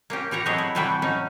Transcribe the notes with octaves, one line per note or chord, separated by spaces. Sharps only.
A#3 C#4 G4
E3 G4 C#5 A#5
F#3 A3 C4 G#4 C#5 D#5
E4
C3 E3 G3 A3 F#4 G5
F#3 C#4 D#4